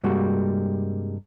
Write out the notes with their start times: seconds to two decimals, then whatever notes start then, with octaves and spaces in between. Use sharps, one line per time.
0.04 G2 C3 G3 G#3 A#3 F#4